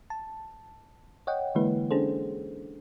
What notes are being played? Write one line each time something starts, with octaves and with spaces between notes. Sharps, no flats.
A5
C#5 D#5 F#5 G5
D3 E3 G#3 A#3 E4 B4
C#4 D4 G#4 A4 C5